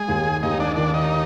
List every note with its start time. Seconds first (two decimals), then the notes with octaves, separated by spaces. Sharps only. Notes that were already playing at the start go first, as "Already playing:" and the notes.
Already playing: G#3 G#4
0.08 D#2
0.43 D#2 D#4
0.60 D4
0.76 D#3 D4
0.94 D#4